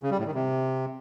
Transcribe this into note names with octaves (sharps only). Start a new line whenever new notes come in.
C#3
G3
A2
D#3
C3